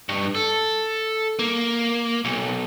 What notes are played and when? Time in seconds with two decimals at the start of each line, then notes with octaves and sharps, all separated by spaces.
0.09 G2
0.35 A4
1.39 A#3
2.25 B1